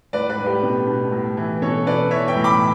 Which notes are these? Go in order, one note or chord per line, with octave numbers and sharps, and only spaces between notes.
A2 B4 D5
B4 D5
A2
G4 B4
B2
B2
A2
E3
B2 A4 C#5
B2 B4 D5
E3 C#5 E5
E5 G5
A2
B5 D6